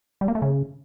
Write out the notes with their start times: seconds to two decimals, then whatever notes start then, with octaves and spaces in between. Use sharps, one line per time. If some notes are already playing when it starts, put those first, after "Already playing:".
0.21 G3
0.28 A#3
0.35 A3
0.42 C#3